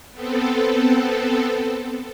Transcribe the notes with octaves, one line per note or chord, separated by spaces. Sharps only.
B3 C4 A4